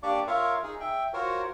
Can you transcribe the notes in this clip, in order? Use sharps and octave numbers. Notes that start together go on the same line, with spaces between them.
A#3 D4 G4 D5 C#6 D6
F4 A#4 C#5 E5 F5
D#4 G#4
E5 G5
F4 F#4 A#4 C5 C#5